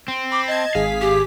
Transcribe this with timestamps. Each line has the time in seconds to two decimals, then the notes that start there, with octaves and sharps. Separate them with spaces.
0.08 C4
0.32 B5 D6
0.47 D#5 A5 G#6
0.75 G#1 G#4 F5 B6
1.01 G4